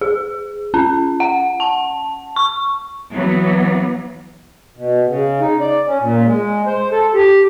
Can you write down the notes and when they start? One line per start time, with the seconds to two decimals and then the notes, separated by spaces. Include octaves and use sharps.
0.01 G#4
0.74 C#4
1.20 F#5
1.60 A5
2.36 C#6
3.13 E3 F#3 B3
4.77 B2
5.08 C#3
5.40 D#4
5.60 D5
5.87 C#4
6.01 A#2
6.25 G#3
6.67 C5
6.92 A4
7.14 G4